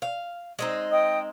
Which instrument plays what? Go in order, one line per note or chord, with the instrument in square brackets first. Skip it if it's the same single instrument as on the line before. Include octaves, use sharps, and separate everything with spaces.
[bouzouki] F5
G#3 C4 D#4
[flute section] D#5 G5 D#6